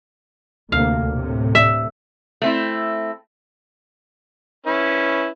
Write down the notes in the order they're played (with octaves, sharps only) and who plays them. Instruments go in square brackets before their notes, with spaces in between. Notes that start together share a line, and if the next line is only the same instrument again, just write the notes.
[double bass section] D2 C3 A#3 [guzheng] F5
[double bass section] A2 C3
[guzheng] E5
[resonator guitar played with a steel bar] A3 C4 E4
[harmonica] C#4 E4 B4